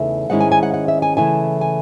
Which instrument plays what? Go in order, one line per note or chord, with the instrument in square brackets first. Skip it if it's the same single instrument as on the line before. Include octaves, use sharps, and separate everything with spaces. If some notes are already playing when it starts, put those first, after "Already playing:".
Already playing: [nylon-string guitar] E2 C#3 E3 A3 D#4 E5
G#2 D#3 G#3 C#4 E4 F#5
G#5
G#5
F#5
F#5
E5
G#5
C#3 E3 A3 E4 G#5
G#5